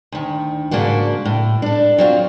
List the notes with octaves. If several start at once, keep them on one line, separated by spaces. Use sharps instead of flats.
D2 D#3
G#2 C#3 A#3 D4 F4 F#4
A2
D4 A4
F#3 C4 F4